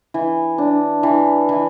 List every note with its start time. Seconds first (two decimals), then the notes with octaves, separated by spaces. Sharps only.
0.14 E3
0.58 D4
1.03 E3
1.49 E3